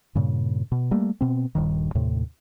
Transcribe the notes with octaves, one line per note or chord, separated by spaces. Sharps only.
G2 A#2 C#3
B2
G3 A3 A#3
B2 C4
D#1 G2 D#3
D#2 A2 C3